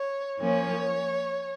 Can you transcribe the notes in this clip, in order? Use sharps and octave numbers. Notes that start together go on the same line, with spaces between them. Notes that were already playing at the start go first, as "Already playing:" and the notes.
Already playing: C#5
F3 A#3 C#4 C#5